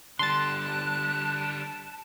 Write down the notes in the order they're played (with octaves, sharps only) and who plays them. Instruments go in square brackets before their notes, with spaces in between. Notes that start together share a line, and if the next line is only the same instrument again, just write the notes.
[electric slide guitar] D3 G3 [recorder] A5 [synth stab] C6 A6 [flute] F#6